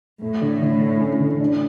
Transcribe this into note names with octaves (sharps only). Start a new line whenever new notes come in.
A2 A3
D3
D3
A3
C#4
D3
D4